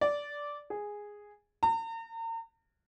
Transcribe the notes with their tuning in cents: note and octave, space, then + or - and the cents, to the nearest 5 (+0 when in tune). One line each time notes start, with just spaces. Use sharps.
D5 -10
G#4 -5
A#5 -40